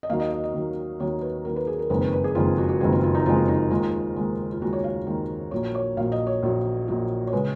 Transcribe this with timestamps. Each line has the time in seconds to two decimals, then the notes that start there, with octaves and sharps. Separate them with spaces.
0.03 D#5
0.09 D#2 D#3 F#3 F5
0.20 D#5
0.32 D#5
0.44 D#5
0.54 D#2 D#3 F#3
1.00 D#2 D#3 F#3 C#5
1.22 B4
1.45 D#2 D#3 F#3 A#4
1.56 B4
1.67 G#4
1.79 A#4
1.90 F#1 F2 D#3 G#3 B4
2.01 B4
2.13 B4
2.24 G#4
2.35 F#1 F2 D#3 G#3 F4
2.58 F#4
2.69 F#4
2.80 F#1 F2 D#3 G#3 G#4
2.92 F4
3.03 F4
3.15 D#4
3.25 F#1 F2 D#3 G#3 F4
3.48 D#4
3.70 D#2 D#3 G#3 F4
4.16 D#2 D#3 G#3
4.52 F4
4.61 D#2 D#3 G#3 F#4
4.73 C#5
4.84 F5
5.07 D#2 D#3 G#3
5.51 A#1 A#2 F#3 C#5
5.75 C#5
5.97 A#1 A#2 F#3 F5
6.12 D#5
6.27 C#5
6.43 A#1 A#2 F#3
6.88 A#1 A#2 F#3
7.27 C#5
7.33 C#3 G#3 B4